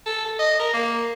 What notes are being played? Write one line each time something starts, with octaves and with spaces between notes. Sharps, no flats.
A4
A4
D#5
A#4
A#3